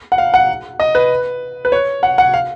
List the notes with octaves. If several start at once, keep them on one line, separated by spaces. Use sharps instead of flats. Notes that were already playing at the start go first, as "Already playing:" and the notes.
F#5
F5
F#5
D#5
B4
B4
C#5
F#5
F#5
F5